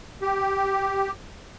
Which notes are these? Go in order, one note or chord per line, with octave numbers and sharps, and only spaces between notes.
G4